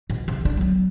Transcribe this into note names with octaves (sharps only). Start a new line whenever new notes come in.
B2
C3
D3 D4
F#3 B3